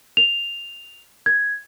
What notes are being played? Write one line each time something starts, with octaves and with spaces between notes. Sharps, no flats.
F7
G#6